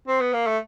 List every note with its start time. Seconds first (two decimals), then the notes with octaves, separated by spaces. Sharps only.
0.08 C4
0.20 B3
0.33 A#3
0.46 A3